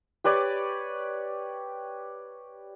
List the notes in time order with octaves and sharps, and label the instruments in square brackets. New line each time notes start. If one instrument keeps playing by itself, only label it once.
[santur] G4 B4 C#5 D5